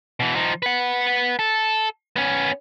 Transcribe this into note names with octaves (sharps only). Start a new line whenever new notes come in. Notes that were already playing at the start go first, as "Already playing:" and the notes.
B2 E3
F3 D#4
B4 F#5
A4
B3 C#4